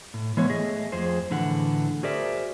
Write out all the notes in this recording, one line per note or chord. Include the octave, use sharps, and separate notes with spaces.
A2
E3 G#3 B3 C#5
A3 G#4 D#5 E5
F2 G#4 C5
A2 D3 E3 F#5
F#4 G#4 A#4 C5 D5 E5